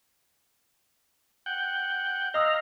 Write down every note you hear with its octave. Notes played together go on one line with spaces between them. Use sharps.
F#5 G5
D#5 F5 A#5 D#6 E6